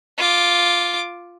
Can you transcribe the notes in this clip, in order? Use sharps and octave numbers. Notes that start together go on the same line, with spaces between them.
F4 D6